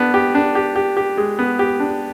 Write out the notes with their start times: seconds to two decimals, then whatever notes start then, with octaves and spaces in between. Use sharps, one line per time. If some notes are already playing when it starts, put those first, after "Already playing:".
Already playing: B3 D4
0.14 G4
0.35 D4
0.55 G4
0.76 G4
0.97 G4
1.17 G#3
1.39 B3
1.59 G4
1.80 D4